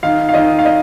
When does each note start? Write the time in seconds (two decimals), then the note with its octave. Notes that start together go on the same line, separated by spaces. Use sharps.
0.03 D#3 F5
0.29 F5
0.33 D#3 D#5
0.59 F5
0.65 D#5